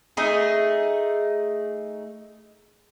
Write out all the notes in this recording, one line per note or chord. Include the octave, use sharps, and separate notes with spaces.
A3 D#4 G#4